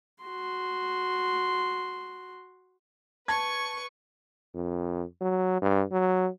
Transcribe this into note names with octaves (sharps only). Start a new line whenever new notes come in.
F#4 C6
B4 A5 C#6 G#6
F2
F#3
G2
F#3